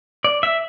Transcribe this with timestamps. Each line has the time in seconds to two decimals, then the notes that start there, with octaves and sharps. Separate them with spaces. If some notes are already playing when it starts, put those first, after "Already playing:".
0.24 D5
0.43 E5